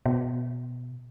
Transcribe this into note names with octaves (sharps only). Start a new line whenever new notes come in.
B2